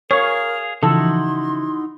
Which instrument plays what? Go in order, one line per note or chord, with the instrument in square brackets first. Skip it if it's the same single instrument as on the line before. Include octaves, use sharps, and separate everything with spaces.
[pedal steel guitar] G#4 F5 [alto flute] A#4 [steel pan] C#5 [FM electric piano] F6
[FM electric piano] C#3 E3 F3 [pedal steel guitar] D#4 E4 F#4 [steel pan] A4 [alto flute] C6